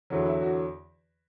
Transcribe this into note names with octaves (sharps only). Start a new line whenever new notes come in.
E2 D3 F#3
E4
F#4